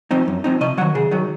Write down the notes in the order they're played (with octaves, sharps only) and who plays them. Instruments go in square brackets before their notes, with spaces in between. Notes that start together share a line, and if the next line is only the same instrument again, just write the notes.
[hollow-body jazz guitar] F3 C4 D#4
F#2
F3 C4 D#4
C3 D#5
F#3 F#5
D#3
C3 G#4
D#3 F#3